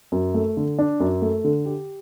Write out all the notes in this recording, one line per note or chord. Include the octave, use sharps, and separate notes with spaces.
F#2
A3
D3
D4
F#2
A3
D3
G4